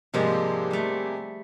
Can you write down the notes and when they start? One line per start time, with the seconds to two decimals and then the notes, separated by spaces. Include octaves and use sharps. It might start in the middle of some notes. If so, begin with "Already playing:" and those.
0.14 G#2 C3 F3 G3 G#3 A#3
0.71 G3 A3